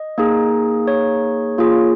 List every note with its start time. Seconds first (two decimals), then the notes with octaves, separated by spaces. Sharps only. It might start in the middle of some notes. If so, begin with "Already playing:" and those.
Already playing: D#5
0.18 A#3 D#4 G#4
0.88 C#5
1.58 A#3 F4 G#4